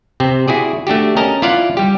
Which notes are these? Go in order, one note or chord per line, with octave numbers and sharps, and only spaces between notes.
C3 C4
E4 F#4 G#4 D5
A3 D4 F#4 G4
C#4 A#4 D#5 A5 A#5
E4 F4 D5 F5 F#5
G3 G4